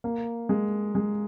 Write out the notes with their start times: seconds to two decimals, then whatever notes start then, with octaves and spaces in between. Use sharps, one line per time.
0.04 A#3
0.49 G#3
0.95 G#3